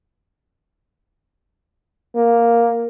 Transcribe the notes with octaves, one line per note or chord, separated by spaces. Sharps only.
A#3